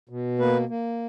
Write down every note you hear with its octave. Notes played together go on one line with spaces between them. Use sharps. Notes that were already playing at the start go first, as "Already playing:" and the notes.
B2
A#3 B4
A#3